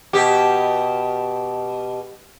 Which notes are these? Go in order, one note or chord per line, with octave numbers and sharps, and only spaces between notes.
B2 G4